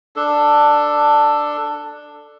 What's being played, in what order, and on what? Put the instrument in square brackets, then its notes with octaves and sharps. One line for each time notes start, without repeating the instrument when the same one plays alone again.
[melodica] D4 A4